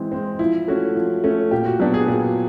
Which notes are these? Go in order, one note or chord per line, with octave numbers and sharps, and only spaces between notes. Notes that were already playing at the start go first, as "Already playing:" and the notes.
Already playing: E3 G#3 C4
G#3 C4
F3 E4
A3 C#4 F#4
F3
A3 C#4
A#2 G4
F#4
F#3 B3 D4 G4
G#4
A#2 G#4